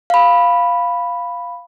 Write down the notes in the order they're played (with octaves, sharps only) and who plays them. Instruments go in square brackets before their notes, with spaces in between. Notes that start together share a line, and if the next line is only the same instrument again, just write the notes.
[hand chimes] F5 B5